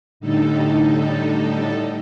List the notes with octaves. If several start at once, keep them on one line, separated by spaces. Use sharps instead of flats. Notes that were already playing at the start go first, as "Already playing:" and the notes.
A2 D3 G3 D#4 A4